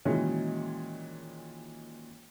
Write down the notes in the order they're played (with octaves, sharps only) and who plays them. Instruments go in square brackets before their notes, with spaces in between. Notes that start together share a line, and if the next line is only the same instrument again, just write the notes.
[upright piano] A#2 D#3 E3 F#3 G#3 C#4